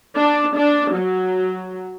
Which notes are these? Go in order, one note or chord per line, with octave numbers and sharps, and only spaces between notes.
D4
D4
F#3